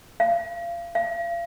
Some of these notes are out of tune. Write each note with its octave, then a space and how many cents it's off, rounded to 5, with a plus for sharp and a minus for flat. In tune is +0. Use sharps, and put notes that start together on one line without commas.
F5 -30
F5 -35